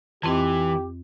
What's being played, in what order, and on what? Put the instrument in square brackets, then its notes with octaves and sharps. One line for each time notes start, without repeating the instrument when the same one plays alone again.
[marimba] F2 C4 D#5 [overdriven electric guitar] E3 [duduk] G4